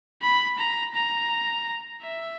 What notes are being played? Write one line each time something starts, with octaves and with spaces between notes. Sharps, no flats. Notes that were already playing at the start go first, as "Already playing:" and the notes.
B5
A#5
A#5
E5